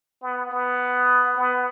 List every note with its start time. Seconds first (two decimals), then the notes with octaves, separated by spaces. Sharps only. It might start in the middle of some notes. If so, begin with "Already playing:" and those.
0.22 B3
0.51 B3
1.37 B3